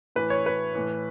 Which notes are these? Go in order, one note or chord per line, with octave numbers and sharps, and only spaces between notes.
A2 E3 B4
C#5
B4
A2 E3